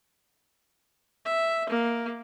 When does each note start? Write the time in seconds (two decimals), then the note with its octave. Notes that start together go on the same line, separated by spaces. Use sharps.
1.25 E5
1.69 A#3